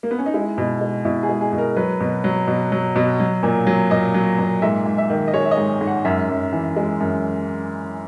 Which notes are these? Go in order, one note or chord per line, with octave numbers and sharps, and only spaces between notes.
A#3
B3
C#4
D#4
G#3 E4
B2
G#3
B2 E4
G#4
G#3
G#4
B2
A#4
F#3 B4
B2
F#3
B2
F#3
B2
F#3
A#2
F#3
A#2 D#5
F#3
A#2
G#2 E5
G#2
E5
D#3
D#5
G#3 C#5
E5
D#5
G#2
G#2
F#5
F#2 E5
F#2
E3
G#3
F#2